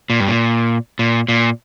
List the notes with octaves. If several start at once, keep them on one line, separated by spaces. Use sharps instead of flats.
A#2
G2
A#2
A#2
A#2